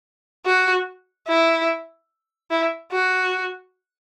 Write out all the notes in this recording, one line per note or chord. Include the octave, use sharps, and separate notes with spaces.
F#4
E4
E4
F#4